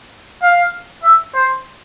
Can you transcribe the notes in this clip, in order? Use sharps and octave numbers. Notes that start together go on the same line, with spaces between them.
F5
E5
C5